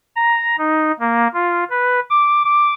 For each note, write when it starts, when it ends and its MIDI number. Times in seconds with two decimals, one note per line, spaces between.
0.16 0.56 82
0.58 0.92 63
1.00 1.28 58
1.34 1.64 65
1.70 2.00 71
2.10 2.44 86
2.45 2.74 86